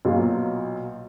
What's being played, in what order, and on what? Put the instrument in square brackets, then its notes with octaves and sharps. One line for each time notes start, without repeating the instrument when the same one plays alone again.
[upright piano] B1 A#2 F#3 A#3 F4